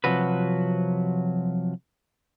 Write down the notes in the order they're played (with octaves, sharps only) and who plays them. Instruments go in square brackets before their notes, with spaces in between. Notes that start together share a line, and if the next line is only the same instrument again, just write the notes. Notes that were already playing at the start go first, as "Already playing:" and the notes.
[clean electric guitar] C3 F3 F#3 F#4 B4